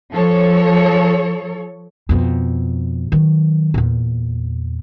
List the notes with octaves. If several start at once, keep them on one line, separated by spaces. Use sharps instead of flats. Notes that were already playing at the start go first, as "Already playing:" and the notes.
F3 A4 C#5
F2 B2
D#3 F#3
E2 A#2